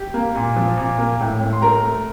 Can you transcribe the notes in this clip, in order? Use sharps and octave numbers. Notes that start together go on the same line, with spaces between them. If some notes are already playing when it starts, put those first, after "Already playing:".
Already playing: G4
A#3
A#2
F3
A#2
A#3
A2
A2
C6
A3 A#4 A#5
A3